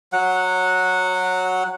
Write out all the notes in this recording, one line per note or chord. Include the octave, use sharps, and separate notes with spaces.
F#3 F#5